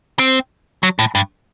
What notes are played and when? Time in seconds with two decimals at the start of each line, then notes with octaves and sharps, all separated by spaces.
0.19 C4
0.83 F#3
0.99 A2
1.15 G2